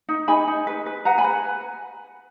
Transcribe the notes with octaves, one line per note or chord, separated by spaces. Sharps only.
D#4
D#4 G#5 B5
D#4
B4
B4
B4 F#5 A#5
G#5 B5
B4